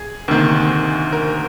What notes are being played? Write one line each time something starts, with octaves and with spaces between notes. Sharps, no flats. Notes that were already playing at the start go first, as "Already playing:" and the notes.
Already playing: G#4
D2 C3 D#3 A#3
A#4